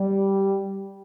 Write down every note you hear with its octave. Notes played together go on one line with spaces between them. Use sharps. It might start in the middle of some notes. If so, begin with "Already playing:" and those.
Already playing: G3